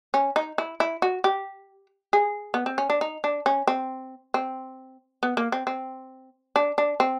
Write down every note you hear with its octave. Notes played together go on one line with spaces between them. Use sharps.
C#4
D#4
E4
E4
F#4
G4
G#4
B3
C4
C#4
D4
D#4
D4
C#4
C4
C4
B3
A#3
C4
C4
D4
D4
C4